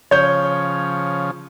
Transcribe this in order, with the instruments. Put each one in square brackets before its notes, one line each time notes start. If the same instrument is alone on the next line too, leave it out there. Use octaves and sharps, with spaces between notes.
[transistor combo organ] C#3 F3 [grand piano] C#5 G6